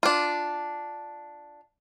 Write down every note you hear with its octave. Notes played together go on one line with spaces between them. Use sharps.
D4 F4